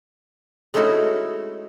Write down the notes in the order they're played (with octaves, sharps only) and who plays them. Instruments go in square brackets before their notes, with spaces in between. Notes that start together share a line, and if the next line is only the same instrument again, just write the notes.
[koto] G#3 A3 C#4 D#4 E4 F#4